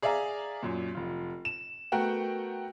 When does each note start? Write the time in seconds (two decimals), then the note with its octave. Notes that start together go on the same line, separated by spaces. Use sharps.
0.02 G#4 D5 E5 F5 G#5 A#5
0.63 F#2 A#2
0.95 F1 F4
1.45 E7
1.92 A3 B3 F#4 A#4 F#5 G5